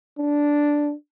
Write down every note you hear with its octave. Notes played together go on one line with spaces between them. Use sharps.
D4